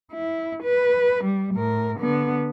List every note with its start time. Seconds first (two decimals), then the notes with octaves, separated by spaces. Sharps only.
0.13 E4
0.64 B4
1.25 G3
1.55 A2 A#4
2.00 D3 B3